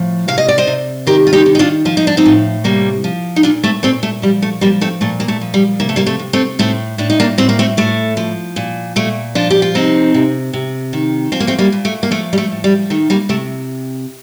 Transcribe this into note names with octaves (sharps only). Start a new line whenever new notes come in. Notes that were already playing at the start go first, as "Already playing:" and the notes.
Already playing: A2 F3
C3 F5
D#5
D5
C5 D#5
C3
D#3 G4 A#4
F4
D#4 G4
D#3
D#4
D4 F4
F3 F4
D#4
D4
C4 D#4
A2
C3 G3 A#3
F3
D#4
A#2 D4 F4
A3 C4
A#2 A3 C4
A3
F3 G3
A3
F3 G3 A#3
A3 C4
A#2 A3
A#3
A3
F3
G3
C3 A#3
A3
G3 A#3
A3 C4
C3
A3 C4
A2 A3 C4
A2 D4
D#4
A#3 D4
A2 C4
A#3
A3 C4
A2 A3
F3
A#2
A#2 A3
F3 D4 F4
G4
F4
C3 C4 D#4
C3
C3
D#3
F3 C4
A#3
A3 C4
G3 A#3
A#2
A3
A#3
F3 A3
G3
A3
A2
G3
D#3 A3
G3 A#3
C3 A3